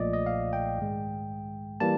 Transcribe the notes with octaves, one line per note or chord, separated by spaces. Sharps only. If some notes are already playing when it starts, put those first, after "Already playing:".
Already playing: B1 A#2 F3 A3 D5 D#5
D#5
F5
G5
G#2 D#3 G#3
E3 G3 A#3 A5